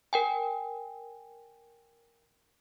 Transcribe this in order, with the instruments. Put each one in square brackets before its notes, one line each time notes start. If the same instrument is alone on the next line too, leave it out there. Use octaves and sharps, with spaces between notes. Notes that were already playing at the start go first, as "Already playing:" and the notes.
[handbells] A#4 G5 G#5